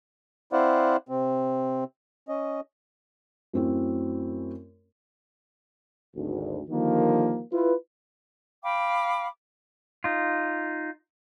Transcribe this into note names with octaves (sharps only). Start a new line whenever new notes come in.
C4 E4 C5 D5 F5 F#5
C3 C4
C#4 D#5
F#2 A3 C4 C#4 E4
G#1 D2
D3 D#3 F3 G3 A#3
E4 F4 B4
F5 G5 B5 D6
D#4 F4